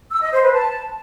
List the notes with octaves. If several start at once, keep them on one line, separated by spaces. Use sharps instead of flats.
E6
D#5
C5
B4
A5